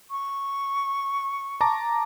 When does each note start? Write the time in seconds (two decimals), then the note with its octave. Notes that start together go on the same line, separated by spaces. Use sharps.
0.10 C#6
1.61 A5 A#5 D6